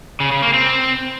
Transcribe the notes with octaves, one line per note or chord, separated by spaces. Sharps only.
C#3
C#3
A#3
C4